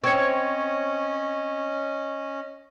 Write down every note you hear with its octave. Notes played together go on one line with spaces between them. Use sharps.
C4 C#4 C#5 D#5 C#6 G#6 C#7